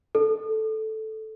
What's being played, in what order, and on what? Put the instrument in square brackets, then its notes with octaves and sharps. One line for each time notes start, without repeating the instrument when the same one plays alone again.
[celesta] A4